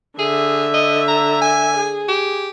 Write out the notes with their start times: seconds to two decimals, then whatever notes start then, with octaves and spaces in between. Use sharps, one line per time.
0.19 D3 G#4 E5
0.74 D#5
1.08 A#5
1.42 G#5
1.77 G#4
2.09 G4